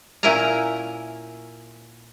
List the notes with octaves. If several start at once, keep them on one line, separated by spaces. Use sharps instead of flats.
A#2 C#4 E4 A#4 G#5 A#5